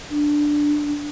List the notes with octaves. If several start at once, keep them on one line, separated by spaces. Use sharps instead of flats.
D4